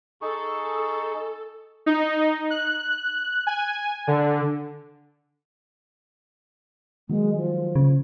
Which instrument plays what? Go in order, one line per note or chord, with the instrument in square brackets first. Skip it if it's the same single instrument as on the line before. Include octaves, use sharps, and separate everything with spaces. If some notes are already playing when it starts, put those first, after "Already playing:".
[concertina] D#4 G#4 C#6 [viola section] A4
[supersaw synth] D#4
F#6
G#5
D3
[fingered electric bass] D#3 F#3 A#3 [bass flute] G#3
[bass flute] F3
[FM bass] C#3